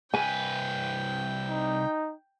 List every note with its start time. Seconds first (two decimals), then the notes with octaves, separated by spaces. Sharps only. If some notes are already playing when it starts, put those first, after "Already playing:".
0.14 C2 B4 G5 G#5
1.50 D#4